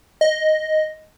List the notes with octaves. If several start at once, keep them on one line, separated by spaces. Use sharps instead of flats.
D#5